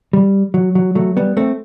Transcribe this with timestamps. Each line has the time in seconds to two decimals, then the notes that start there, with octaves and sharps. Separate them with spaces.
0.13 G3
0.54 F#3
0.75 F#3
0.95 F#3 A3
1.17 G3 B3
1.37 A3 C4